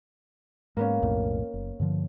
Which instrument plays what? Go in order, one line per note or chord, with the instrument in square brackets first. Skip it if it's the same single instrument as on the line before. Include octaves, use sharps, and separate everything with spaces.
[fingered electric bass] G#2 [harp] A#3 B3 C#4
[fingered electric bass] B1 F2 A2
F#1
G2 D3 F3